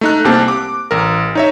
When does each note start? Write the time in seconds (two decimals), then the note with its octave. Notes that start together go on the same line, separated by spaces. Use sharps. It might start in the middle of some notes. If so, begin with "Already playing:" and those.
0.01 A3 D#4 F#6
0.24 C2 A#3 C4 G4 A5
0.48 D6
0.91 A1 A#4
1.35 D#4 C#5 E5